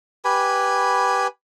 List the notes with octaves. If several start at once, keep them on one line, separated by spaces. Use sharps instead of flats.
G4 B4 G#5 B5